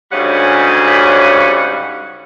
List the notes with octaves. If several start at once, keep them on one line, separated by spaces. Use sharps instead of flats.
D2 G#2 C#3 G3 C#4 F#5